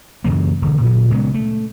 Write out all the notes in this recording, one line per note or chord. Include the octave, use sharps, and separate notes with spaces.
F#2 C#3 E3 A#3
E1 D3
A#2 F#3
C#3 G#3 B3
A3